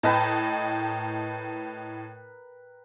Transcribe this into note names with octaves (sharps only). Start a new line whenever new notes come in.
A2 A#4 B4 D#5 G5 A5